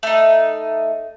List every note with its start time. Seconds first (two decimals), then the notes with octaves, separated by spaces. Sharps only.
0.03 A3 D#4